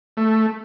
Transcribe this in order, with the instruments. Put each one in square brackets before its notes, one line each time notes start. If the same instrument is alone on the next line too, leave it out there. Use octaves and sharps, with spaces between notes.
[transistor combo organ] A3